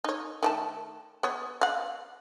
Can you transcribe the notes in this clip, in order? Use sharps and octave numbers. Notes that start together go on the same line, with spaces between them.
D#4 C#5
D#3 A3 A5
B3 C#5
F5 F#5